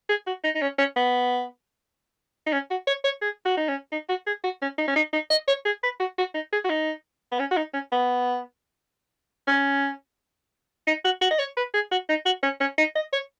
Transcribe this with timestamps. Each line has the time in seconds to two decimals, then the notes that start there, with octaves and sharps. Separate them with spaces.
0.09 G#4
0.27 F#4
0.44 D#4
0.55 D#4
0.62 C#4
0.79 C#4
0.96 B3
2.47 D#4
2.53 C#4
2.71 F#4
2.87 C#5
3.04 C#5
3.22 G#4
3.45 F#4
3.57 D#4
3.68 C#4
3.92 D#4
4.09 F#4
4.27 G#4
4.44 F#4
4.62 C#4
4.78 D#4
4.88 C#4
4.96 D#4
5.13 D#4
5.30 D#5
5.48 C#5
5.65 G#4
5.83 B4
6.00 F#4
6.18 F#4
6.34 D#4
6.53 G#4
6.64 F#4
6.70 D#4
7.32 B3
7.40 C#4
7.51 F#4
7.57 D#4
7.74 C#4
7.92 B3
9.47 C#4
10.87 D#4
11.04 F#4
11.21 F#4
11.31 D#5
11.39 C#5
11.57 B4
11.74 G#4
11.91 F#4
12.09 D#4
12.26 F#4
12.43 C#4
12.60 C#4
12.78 D#4
12.95 D#5
13.13 C#5